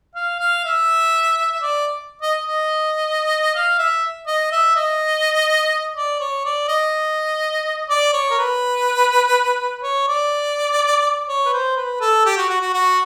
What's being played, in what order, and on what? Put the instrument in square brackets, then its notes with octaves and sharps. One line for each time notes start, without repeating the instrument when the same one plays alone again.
[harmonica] F5
F5
E5
D5
D#5
D#5
F5
E5
D#5
E5
D#5
D5
C#5
D5
D#5
D5
C#5
A#4
B4
C#5
D5
C#5
B4
C5
B4
A4
G4
F#4
F#4
F#4
F#4